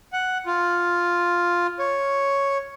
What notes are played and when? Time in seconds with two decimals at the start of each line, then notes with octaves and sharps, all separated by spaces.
0.13 F#5
0.46 F4
1.79 C#5